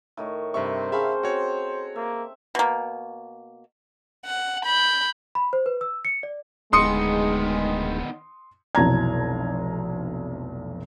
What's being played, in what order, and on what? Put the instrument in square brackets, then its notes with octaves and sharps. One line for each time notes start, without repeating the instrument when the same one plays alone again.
[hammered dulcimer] A2 D#3 C#5
[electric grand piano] G2 E5 C#6 [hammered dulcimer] C3 A#4 [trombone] C5
[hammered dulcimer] C4 C#4 A4 [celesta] G#4 [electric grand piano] E5 F5 B5
[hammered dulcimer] C4 [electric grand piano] F#4 C#5
[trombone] A#3 [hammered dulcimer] E5
[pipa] B2 A#3
[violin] F#5
B5 G6
[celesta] B5
C5
B4
E6
C#7
D5
[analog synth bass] D1 [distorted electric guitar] D#3 B3 [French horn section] G#3 [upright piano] C6 D#6 C#7
[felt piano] F1 B1 E3 A#5 G#6